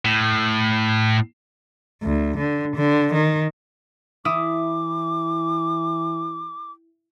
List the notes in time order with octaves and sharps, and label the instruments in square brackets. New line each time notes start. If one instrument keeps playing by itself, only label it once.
[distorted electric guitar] A2
[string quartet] D2
D3
D3
D#3
[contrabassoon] E3 [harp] E4 D#6 [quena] D6